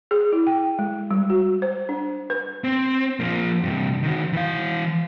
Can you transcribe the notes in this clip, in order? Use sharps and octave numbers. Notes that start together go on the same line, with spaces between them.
G#4
E4
G5
G#3
G3
F#4
C5
D4
B4
C4
F3 A#3
G2 C3
D#3 F#4
E3 F5